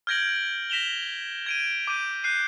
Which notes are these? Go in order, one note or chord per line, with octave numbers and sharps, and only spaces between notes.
F6 G6 G#6 A#6 D7 F#7
A#6 B6 E7 F7 G7
G#6 D7 D#7
D6 G6 D#7
F#6 G6 C7 D#7